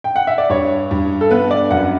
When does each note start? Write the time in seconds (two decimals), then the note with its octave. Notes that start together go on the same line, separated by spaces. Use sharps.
0.04 G5
0.16 F#5
0.27 E5
0.38 D5
0.50 G2 C#5
0.91 G2
1.21 A4
1.31 B3 B4
1.51 D5
1.71 F#2 F#5